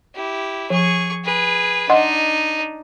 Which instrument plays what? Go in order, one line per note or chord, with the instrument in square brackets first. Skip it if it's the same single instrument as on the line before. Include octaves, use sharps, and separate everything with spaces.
[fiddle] E4 G4
[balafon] F3 [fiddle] G#4 C#6
[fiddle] G#4 B4
[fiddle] D4 D#4 [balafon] D#5 F#5 C6